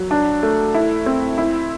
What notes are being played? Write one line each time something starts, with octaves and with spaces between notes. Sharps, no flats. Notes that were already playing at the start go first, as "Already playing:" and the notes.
Already playing: F#3
D4
A3
E4
C4
E4